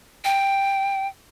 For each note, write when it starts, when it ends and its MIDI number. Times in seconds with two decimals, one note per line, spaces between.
0.25 1.07 79